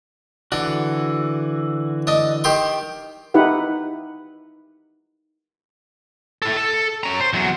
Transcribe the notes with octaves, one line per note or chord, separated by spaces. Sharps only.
D3 E3 D4 F#4
D4 D#5
D#3 G4 C6
D#4 E4 G4 B4 F#5
E4 A4
A4
C#4 A#5
C5
E2 F#3